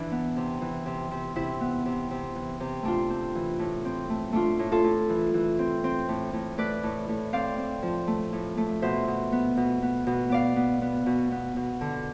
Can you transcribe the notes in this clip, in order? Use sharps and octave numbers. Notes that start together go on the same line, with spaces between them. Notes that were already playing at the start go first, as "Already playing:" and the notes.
Already playing: E3 D4
B3
C3
E3
C3
C3
C3 E4
B3
C3
C3
E3
C3
A3 D4 F4
C4
E3
A2
C4
A3
A3 D4 F4
A2
F4 A4
A2
E3
E3
C4
C4
A2
A2
A3 B4 D5
A2
A2
C4 D5 F5
C4
F3
A3
A2
A3
B2 C5 E5
B2
B3
B2
B3
B2
B3 D5 F5
B3
B3
B2
B3
B2
D3